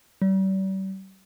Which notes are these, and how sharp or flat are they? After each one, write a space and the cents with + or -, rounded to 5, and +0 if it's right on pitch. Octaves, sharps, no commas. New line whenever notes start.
G3 -40